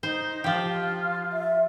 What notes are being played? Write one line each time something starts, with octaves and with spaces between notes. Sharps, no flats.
D#4 C5
F3 F4 G4
E5